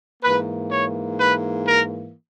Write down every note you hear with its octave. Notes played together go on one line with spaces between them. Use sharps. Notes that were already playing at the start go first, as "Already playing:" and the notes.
G#2 E3 A#3 B4
C#5
B4
A#4